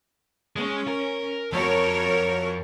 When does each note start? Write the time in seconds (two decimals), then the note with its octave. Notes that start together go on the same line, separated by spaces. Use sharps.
0.56 G#3 C#4
0.88 A#4
1.53 F2 F#4 A#4 C#5